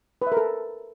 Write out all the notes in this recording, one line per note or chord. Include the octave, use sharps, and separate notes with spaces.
B4
E5
A#4
A4